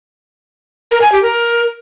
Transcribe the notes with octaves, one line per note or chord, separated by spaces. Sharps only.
A#4
G#5
G4
A#4